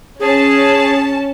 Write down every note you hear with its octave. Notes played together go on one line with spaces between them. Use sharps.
C#4 G#4 A5